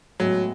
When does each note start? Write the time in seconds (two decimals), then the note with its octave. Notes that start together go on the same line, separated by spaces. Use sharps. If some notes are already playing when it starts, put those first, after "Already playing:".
0.20 A2 F#3 G#3 B3